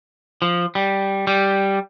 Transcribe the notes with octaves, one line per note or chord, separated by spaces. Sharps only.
F3
G3
G3